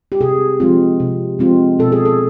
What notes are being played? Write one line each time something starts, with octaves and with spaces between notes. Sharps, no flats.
G4
C3 G#4
F3 G#3 C4 F4
C3
F3 G#3 C4 F4
B2 A4
G#4
A4